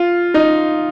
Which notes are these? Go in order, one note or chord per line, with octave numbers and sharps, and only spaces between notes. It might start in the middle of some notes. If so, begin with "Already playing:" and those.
Already playing: F4
D#4